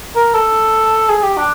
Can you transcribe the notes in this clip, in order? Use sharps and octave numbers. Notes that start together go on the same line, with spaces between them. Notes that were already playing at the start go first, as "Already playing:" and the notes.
A#4
A4
G#4
G4
D4